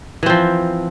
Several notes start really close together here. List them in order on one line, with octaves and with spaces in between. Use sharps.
E3 C4 F3